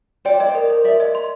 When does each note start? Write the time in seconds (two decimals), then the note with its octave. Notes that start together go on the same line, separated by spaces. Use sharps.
0.25 C5 D5 G5
0.40 C5 D5 D#5
0.55 A#4
0.70 A#4
0.84 A#4 D5 E5
1.00 D#5
1.15 C6